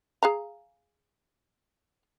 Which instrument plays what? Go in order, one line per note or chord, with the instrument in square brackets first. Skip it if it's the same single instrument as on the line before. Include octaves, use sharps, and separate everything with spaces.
[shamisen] G#4 F5 A#5